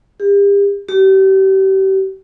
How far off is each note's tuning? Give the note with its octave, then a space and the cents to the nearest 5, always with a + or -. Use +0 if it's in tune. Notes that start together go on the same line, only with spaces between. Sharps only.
G4 +40
G4 -35